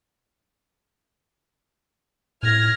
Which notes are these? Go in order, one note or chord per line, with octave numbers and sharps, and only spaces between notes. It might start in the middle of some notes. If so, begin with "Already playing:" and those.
A2 F6 G#6 A#6